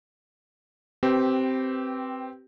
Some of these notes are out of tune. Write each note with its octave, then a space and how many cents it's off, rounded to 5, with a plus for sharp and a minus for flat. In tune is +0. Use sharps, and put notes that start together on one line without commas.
C4 +0 G4 -20 B4 +0